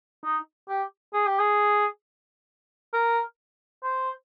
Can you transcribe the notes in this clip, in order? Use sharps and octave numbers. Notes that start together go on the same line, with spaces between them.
D#4
G4
G#4
G4
G#4
A#4
C5